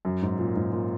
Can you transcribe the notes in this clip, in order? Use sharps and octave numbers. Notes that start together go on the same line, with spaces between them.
F#2
G#2
A#2
G#2
A#2